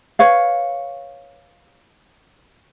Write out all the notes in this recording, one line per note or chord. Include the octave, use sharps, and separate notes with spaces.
B4 C#5 F5